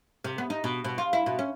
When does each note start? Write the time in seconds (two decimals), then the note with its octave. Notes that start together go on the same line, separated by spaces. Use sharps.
0.24 C3
0.38 B3
0.50 D#4
0.64 B2
0.84 B2
0.98 F4
1.13 E4
1.26 B2
1.39 C#4